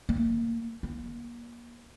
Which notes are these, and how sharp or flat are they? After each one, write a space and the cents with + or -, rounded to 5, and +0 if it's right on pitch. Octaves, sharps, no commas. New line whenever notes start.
A#3 -15
A#3 +30